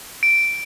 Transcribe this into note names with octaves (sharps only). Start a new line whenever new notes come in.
D7